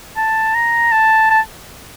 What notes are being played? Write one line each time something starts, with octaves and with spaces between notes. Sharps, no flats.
A5
A#5
A5
A5